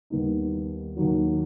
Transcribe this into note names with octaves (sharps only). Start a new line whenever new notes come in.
D#2 D#3 G3 B3 D#4
D#2 D#3 F#3